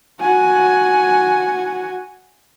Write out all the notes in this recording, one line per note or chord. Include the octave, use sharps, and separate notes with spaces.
F#4 G#5